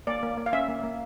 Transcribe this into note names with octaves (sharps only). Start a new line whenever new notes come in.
A#3 D5
A#3
A#3
F5
C#4 E5
A#3
A#3